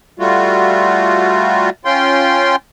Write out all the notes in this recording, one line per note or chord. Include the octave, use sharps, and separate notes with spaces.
G3 A3 F4 F#4
C#4 F4 G5 C6